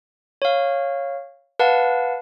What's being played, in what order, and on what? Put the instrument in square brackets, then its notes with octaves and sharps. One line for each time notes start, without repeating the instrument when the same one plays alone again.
[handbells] C#5 F5
B4 F5 F#5 A5